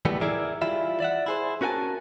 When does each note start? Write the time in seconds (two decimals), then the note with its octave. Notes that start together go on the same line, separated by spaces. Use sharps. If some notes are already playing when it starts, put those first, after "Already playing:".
0.05 A2 E3 G3 A3 B3
0.21 E4 G#4 A#4 D5 E5
0.62 E3 G3 E4 F4 E5
1.00 D5 E5 F#5
1.26 E4 G#4 C5
1.61 C#4 F#4 A#4 F#5 G#5 A5